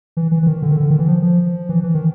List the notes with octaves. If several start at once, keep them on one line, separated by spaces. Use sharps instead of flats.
E3
E3
E3
D#3
D3
D#3
D3
D#3
E3
F3
F3
E3
E3
D#3